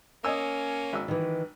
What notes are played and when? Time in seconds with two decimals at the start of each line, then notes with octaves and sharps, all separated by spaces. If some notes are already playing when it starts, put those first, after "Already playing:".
0.25 A#3 C#4 D#5 G#5 E6
0.93 G#1 E6
1.08 D#3 E3